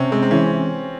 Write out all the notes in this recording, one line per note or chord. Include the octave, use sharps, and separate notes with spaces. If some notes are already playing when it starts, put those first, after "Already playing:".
Already playing: C3 C4 C#4
G#3 C4
C4
E3 C#4